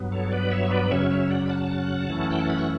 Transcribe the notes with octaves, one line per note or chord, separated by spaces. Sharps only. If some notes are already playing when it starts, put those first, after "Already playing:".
Already playing: G2 F#3 B3
A4 C#5
B4 D5
C#5 E5
B4 D5
F#2 C#3 F#3 C#4 C#5 E5
C#5 E5
D5 F#5
B5
F#5 A5
F#2 E3 A3 C#4 E4
G5
A5
B5
C#6